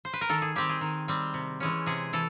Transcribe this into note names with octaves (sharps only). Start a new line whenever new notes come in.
C5
B4
A#4
D#3 A4
G#4
G3 C4 G4
G#4
D#3
G3 C4
C3
E3 G#3 C#4
C3 G#4
E3 A4